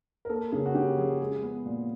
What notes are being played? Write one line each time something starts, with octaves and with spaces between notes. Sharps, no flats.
A#4
A#3 A4
C#3 G#4
F#4
C#3 G4
F3 G#4
G#3 G#4
B3
A#2